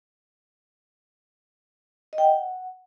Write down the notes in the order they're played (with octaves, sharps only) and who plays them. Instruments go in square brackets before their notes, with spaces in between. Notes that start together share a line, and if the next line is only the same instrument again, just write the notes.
[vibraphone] D#5
G5
F#5